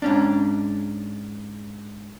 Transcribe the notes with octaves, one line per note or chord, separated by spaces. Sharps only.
G#2 C#4 D4